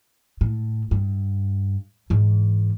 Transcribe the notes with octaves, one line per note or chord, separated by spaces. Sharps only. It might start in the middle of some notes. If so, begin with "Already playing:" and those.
A2
G2
G#2 E3